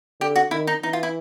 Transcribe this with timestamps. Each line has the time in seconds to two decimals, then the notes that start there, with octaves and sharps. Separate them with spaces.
0.20 D3 G4
0.36 F#4
0.51 D#3 E4
0.67 D#4
0.83 E3 D#4
0.93 F4
1.03 E4